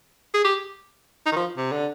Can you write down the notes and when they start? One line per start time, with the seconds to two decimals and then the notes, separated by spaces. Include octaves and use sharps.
0.34 G#4
0.44 G4
1.26 D#4
1.32 D#3
1.36 F3
1.57 C3
1.72 D3